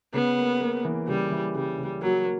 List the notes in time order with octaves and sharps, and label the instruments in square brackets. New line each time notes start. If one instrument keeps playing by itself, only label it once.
[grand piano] C#3 [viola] B3
[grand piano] A#3
A#3
E3
[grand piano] C#3 [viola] G3
[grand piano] E3
[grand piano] C#3 [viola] G3
[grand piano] C#3
[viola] F#3 [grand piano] A#3
[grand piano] A#3